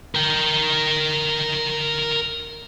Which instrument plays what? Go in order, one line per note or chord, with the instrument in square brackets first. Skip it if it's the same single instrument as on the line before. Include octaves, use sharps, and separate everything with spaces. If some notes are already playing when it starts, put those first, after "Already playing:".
[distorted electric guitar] A#4 G5